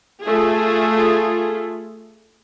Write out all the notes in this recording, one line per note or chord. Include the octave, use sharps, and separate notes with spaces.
A3 F4 G#4